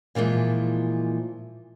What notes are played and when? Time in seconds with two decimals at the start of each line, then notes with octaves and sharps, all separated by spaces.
0.15 A#2 E3 F3 G#3